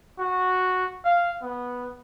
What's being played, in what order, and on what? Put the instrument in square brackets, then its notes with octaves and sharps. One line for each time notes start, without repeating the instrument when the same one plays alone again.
[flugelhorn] F#4
F5
B3